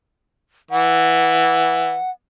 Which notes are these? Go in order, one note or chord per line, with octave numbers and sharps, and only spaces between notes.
E3 F#5